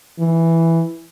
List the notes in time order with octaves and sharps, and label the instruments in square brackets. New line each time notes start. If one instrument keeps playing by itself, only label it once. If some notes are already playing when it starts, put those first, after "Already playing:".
[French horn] E3